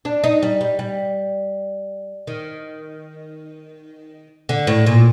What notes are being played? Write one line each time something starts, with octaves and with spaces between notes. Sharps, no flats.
D4
D#4
G3
G3
G3
D#3
D3
A2
A#2